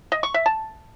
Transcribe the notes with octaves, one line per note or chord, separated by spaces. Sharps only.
D#5
C#6
E5
A5